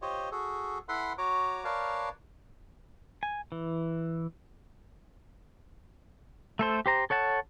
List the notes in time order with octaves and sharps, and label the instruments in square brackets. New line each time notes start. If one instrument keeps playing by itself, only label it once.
[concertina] F4 G4 C5 C#5 D#5
F#4 G#4 A4
E4 A4 B4 F#5 B5 C6
F#4 C#5 A#5 D6
A#4 B4 C#5 D5 F5 A5
[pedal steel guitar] G#5
E3
A3 A4 C5
G4 C5 A#5
A4 C#5 F#5 A5